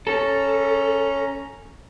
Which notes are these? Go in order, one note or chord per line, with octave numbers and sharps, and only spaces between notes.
C#4 A4 A#5